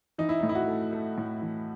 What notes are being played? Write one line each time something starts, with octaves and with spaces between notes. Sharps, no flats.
E3 D#4
E4
A2 D#4
E4
F#4
A3
A3
A2
E3